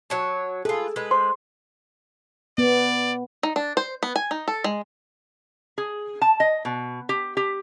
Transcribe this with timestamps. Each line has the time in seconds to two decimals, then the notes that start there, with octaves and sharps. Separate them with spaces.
0.10 F#3 C#5 A5
0.65 F4 G#4 A4 B4
0.96 G#3 B4
1.11 C5 C6
2.58 B3 D5
3.43 D#4
3.56 D4
3.77 C5
4.03 B3
4.16 G#5
4.31 D#4
4.48 A4
4.64 G#3
5.78 G#4
6.22 A5
6.40 D#5
6.65 B2
7.09 G4
7.37 G4